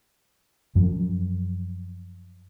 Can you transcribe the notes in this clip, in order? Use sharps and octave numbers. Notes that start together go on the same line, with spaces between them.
F#2 F3 F#3